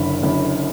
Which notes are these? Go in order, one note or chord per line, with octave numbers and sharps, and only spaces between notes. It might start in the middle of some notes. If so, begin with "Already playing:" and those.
Already playing: F#1 F#2 D3 B5
F#1 F#2 D3